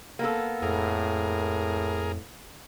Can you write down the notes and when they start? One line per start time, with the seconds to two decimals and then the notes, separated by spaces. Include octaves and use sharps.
0.19 A#3 B3 A4
0.62 F2 A2 G#4 A#4